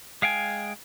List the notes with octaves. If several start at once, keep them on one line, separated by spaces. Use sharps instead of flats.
G#3 F5 G5 G#5